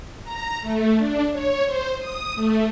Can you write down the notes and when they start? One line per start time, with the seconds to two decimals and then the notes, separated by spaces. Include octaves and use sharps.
0.24 A#5
0.62 A3
0.98 D4
1.32 C#5
1.66 C5
1.98 D#6
2.36 A3